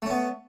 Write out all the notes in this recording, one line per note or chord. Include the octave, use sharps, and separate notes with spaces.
A3 B3 C#4